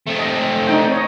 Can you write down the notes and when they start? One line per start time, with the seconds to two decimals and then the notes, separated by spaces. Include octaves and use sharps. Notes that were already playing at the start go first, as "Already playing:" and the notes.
0.07 A3 C4
0.19 D#5
0.67 D4 D#4 G5
0.92 C#5 D#5